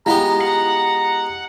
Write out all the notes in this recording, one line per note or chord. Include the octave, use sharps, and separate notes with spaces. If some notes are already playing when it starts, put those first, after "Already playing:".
G#3 B3 E4 F4 G4 F5 A#5
F#5 A#5